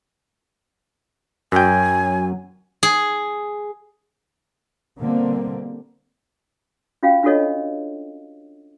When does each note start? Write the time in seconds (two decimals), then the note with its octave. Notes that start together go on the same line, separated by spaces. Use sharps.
1.52 F#2 F#3 G5 G#5
2.83 G#4
4.98 B2 D3 G3 A#3 C4
7.03 C#4 F4 F#4 F5 G5
7.23 D4 F4 F#4 A4 C#5 D#5